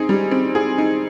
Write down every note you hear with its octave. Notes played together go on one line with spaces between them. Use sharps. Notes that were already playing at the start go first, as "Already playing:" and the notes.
Already playing: C4 D#4 G#4
G3
C4
G#4
D#4